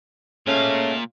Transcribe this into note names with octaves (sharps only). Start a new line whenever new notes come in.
A#2 G#3 A3 C#4 F5